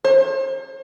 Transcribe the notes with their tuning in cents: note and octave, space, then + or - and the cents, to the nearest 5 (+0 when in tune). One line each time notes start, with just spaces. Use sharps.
C5 +40